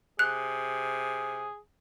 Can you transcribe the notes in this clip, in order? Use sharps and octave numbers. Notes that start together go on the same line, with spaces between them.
C3 G#4 F#6